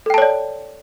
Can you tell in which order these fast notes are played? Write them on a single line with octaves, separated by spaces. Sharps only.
A4 G5 A5 C#5 D5